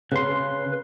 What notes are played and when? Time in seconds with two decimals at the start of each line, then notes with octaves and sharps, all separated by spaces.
0.12 C#3 B4 C6